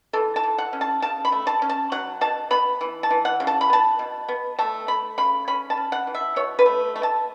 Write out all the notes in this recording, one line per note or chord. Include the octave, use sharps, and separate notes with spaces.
E3 A4
A5
E3
F#5
C#4
A5
C#3 A5
B5
A3
A5
C#4
A5
F#3 F#5
B2 A5
B3 B5
E3
A5
E3
F#5
C#3
A5
B5
B3 A5
B2
B3
A3 A5
A3 B5
C#3 B5
C#4 B5
A5
C#4
F#5
E3
E5
B2 C#5
B4
A3
A3
A5